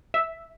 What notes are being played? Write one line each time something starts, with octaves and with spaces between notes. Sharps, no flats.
E5